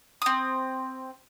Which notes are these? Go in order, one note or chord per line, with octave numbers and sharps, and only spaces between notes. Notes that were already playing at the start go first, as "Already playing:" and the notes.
C4 D#6